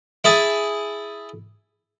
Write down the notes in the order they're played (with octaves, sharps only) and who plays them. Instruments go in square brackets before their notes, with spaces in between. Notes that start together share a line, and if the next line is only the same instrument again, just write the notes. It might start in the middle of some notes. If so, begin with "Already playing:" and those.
[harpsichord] E4 G#4 A5